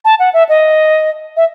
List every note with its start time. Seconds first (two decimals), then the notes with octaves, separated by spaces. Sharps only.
0.05 A5
0.19 F#5
0.33 E5
0.49 D#5
1.37 E5